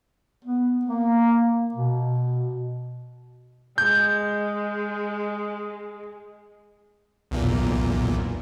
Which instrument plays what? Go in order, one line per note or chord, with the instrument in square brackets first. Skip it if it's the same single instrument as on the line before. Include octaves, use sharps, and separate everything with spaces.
[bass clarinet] B3
A#3
B2
[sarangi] G#3 [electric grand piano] G6
[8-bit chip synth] B1 E2 A#2